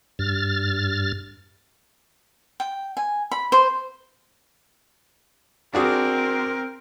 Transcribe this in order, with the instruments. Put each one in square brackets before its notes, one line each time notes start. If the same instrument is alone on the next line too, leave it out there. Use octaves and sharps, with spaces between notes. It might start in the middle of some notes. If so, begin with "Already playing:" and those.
[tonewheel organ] G2 F6 A6
[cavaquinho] G5
G#5
B5
C5
[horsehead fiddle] C4 A#4 [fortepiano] D4 F#4 G#4